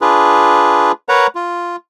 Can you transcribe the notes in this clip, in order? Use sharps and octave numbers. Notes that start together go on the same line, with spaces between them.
D4 F4 G#4 B4
A#4 B4 C#5 F#5 A#5
F4